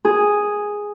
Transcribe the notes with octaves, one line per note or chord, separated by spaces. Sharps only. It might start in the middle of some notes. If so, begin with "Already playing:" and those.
G#4